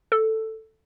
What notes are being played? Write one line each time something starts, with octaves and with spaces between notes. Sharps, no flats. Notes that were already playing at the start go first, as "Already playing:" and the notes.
A4